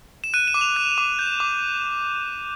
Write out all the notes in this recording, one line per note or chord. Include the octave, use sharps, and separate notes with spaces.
E7
F#6 D#7
E7
D6
F7
F#6
D6
G6
D6